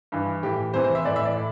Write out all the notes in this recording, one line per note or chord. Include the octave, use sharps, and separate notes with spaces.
G2 E3
A2 E3 G4
E2 C3 E3 C5
C5
E5
A2 E3 D5
E5
D5
A2